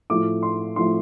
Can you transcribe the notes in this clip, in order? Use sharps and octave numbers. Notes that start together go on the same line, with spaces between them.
A2 F3 A3 D6
C6
A2 F3 A3 C6